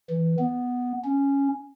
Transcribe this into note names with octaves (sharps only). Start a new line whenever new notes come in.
E3
B3
C#4